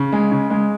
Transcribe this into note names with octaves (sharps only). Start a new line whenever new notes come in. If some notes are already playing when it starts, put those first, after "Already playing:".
Already playing: C#3
G#3
C#3
G#3